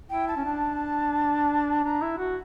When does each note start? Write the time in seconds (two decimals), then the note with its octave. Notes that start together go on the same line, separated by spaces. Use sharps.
0.10 E4 G5
0.28 A5
0.36 C#4
0.45 D4
1.84 D4 A#5
2.02 E4
2.18 F#4